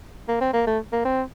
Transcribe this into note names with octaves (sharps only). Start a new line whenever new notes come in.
A#3
C4
A#3
A3
A#3
C4